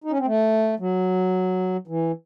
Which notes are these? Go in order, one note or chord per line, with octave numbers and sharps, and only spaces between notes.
D#4
C#4
C4
A3
F#3
E3